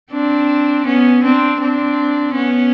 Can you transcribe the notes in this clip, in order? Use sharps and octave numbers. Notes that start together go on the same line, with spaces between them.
C4 D4
B3 C#4
C4 D4
C4 D4
B3 C#4